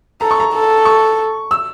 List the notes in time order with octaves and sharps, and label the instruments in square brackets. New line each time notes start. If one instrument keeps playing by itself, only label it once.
[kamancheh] A4 [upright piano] A#5
[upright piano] C#6
A#5
[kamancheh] A4
[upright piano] C#6
E6